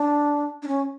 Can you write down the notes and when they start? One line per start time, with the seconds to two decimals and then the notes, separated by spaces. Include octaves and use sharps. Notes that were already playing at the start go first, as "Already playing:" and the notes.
Already playing: D4
0.62 D4
0.68 C#4